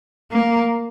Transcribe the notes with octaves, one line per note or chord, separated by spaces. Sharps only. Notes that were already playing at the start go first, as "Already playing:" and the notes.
A#3